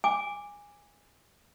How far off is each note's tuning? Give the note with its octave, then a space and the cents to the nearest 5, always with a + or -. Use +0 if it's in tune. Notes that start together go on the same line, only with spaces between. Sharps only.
G#5 -20 D6 +0